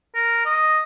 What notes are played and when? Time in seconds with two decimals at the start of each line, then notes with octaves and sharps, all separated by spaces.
0.15 A#4
0.46 D#5